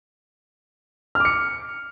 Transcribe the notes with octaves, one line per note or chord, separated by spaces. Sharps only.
D6 F6 C#7